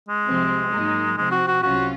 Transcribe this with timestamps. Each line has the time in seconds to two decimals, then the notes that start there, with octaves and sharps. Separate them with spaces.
0.09 G#3
0.25 C2 C3 F3 C4
0.71 G#2 F#3 A#3 D#4
1.17 C3 F3 G#3 C4
1.32 F#4
1.47 F#4
1.63 C2 C3 F#3 C#4 F4 F#4